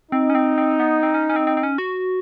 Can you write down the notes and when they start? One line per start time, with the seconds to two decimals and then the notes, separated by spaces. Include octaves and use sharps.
0.12 C4 D#4
0.30 C#4
0.35 C4
0.58 C4
0.80 B3
1.03 C4
1.14 C#4
1.30 C#4
1.36 C4
1.47 C4
1.57 C4
1.63 C#4
1.78 F#4